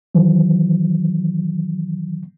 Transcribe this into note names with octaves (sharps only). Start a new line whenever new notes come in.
D#3 E3 F#3